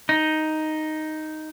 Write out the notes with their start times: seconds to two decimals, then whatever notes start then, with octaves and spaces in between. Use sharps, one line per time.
0.09 D#4